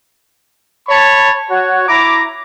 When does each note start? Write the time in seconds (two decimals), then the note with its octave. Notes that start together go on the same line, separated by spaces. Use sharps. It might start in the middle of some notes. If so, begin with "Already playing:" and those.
0.88 C#5 A5 B5 C#6
1.50 F#4 C#5
1.88 E4 A#5 D6